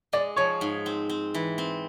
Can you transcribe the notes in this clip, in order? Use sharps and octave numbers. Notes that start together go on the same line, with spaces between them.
G#3 D5
F3 C#5
G#2
C4
C4
E3
C4